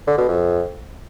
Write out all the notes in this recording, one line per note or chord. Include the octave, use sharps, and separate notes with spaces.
D3
B2
F2